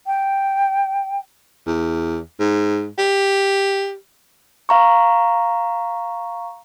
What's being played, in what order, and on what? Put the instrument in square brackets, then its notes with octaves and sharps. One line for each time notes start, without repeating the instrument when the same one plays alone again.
[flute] G5
[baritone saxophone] E2
G#2
G4
[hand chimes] F5 A#5 C#6